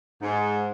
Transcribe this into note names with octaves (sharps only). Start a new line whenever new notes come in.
G#2